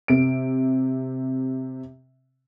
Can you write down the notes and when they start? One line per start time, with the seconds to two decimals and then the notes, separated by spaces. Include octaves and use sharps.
0.08 C3 D7